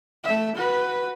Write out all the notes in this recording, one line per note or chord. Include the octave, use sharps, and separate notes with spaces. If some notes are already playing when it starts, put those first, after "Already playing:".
A3 E5
F#4 B4